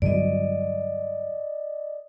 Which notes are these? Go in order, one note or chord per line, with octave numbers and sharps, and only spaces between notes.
G2 D3 F#3 D5 D#5